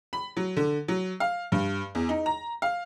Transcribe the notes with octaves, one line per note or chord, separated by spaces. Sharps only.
B5
F#3
D3
F#3
F5
G2
E2
D#4
A#5
F5